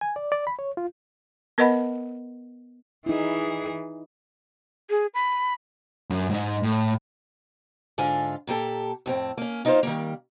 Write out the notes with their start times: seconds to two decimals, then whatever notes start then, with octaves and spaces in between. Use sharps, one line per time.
0.01 G#5
0.16 D5
0.32 D5
0.47 B5
0.59 C#5
0.77 F4
1.58 B3 A#4 B4 D#5 F#5 B5
3.06 E3 D#4 E4 G#4
4.90 G#4
5.14 B5
6.10 F#2
6.30 G#2 D#4
6.63 A2
7.98 G#2 D3 F4 G#5
8.47 A#2 A#3 G4 A4
9.06 F2 A2 C4
9.37 A#3 C#4
9.65 A#3 D#4 F4 G#4 C5 F5
9.83 D#3 G3 A#3